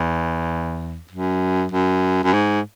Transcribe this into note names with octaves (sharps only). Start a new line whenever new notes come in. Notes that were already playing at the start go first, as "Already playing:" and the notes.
Already playing: E2
F#2
F#2
F#2
G#2